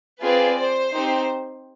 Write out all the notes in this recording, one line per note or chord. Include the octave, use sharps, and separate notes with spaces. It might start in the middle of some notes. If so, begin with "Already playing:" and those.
C4 F4 G#4 B4 D5
C5
C4 D#4 G4